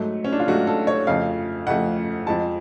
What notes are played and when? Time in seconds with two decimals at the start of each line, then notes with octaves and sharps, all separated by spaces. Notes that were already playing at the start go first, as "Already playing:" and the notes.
Already playing: G#2 F#3 A3
0.25 C#4
0.32 D4
0.40 F4
0.48 G#2 F#3 A3 F#4
0.67 A4
0.87 C#5
1.07 F2 C#3 F3 A3 F5
1.67 F2 C#3 F3 A3 F#5
2.26 F2 F3 G#3 A5